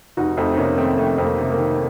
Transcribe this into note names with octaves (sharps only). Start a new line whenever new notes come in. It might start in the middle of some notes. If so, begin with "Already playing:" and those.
F1 D#4 F#4
F2 A3 C4
D#4
C3 A#3 C#4
D#3 A3 C4
F1 A3 C4
F2
A#3
C3
A#3
D#3